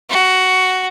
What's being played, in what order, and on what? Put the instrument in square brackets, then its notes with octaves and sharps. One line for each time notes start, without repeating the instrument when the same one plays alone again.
[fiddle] F#4